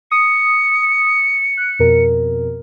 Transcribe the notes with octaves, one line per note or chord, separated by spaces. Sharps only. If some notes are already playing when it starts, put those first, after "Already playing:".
D#6 C#7
F#6
F2 B2 A#4